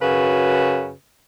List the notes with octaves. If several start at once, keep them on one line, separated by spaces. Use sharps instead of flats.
F#2 C#3 F#4 B4